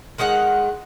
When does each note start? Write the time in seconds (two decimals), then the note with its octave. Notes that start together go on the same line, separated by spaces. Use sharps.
0.18 D#3 G#3 D#4 F#5